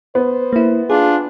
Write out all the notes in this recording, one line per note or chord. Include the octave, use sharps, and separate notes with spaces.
B3 C5
A#3 E4
D4 F4 G#4